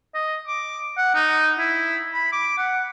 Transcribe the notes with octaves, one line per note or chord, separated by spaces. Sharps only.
D#5
D6
F#5
D#4
E4
B5
D6
F#5